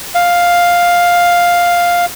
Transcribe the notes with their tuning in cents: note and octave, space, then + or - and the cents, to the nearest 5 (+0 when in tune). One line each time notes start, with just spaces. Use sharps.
F5 +5